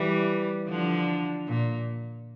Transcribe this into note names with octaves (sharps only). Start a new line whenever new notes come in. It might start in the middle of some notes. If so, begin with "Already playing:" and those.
Already playing: E3 G3
D3 F3
A#2